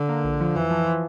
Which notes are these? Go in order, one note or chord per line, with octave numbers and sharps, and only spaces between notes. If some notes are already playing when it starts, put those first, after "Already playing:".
Already playing: D3
A#3
A#1
F3
F2 E3
F3